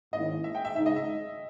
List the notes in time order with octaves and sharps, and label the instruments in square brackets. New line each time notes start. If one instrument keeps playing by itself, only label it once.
[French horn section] G#2 D#3 A#3 C#4 E4 [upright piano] D#5
[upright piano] E5
G5
E5
[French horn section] C#3 G#3 D#4 [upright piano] E5
[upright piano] D#5
E5